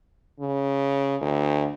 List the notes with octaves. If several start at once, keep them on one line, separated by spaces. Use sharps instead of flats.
C#3
D2